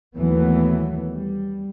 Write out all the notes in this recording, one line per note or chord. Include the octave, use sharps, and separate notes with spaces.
D#2 E3 F#3 A3 B3
G3